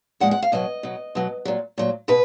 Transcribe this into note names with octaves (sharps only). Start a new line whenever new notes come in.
A#2 F3 G#3 F#5
F#5
F5
B2 F#3 D#5
B2 F#3
B2 F#3
A#2 F#3
A#2 F#3
B2 B4